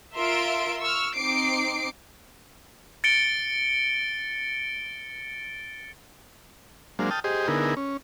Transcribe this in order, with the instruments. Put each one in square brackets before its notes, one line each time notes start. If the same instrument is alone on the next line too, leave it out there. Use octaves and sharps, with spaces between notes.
[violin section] F4 A#4 E5 C6 D7
C#6 E6 F6
C4 D#4 D6 C7 D7
[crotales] A6 C#7 D7 G7
[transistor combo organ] F#3 G#3 A#3 D4 C5 F5
G5 A5 D#6 F6
G4 G#4 C5 D#5
D3 B3 D#4 E4 G#4 A#4
C#4